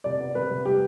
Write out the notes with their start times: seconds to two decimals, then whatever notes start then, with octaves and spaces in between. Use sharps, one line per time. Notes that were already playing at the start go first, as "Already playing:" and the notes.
0.04 C3 D5
0.20 B3
0.35 C3 B4
0.51 C3
0.65 G3 G4